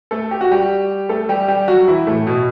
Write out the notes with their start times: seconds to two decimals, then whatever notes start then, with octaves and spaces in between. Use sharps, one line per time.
0.11 A3 A4
0.31 G4
0.41 F#4
0.51 G3 G4
1.09 A3 A4
1.29 G3 G4
1.48 G3 G4
1.68 F#3 F#4
1.88 E3 E4
2.07 A2 A3
2.27 B2